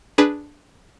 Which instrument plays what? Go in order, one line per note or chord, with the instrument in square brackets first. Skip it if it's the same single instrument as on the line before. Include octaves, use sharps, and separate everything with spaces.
[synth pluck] D4 G#4 B4